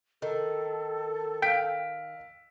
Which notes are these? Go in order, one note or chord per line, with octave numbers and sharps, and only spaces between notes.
D#3 A4
F5 G5 B6 D7